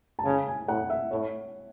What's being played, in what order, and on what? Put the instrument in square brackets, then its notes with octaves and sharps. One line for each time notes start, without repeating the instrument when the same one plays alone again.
[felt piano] A5
[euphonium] C#3 [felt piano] G#5
[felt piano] G#5
[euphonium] A2 [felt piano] F#5
[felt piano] E5
[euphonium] A2 [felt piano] C#5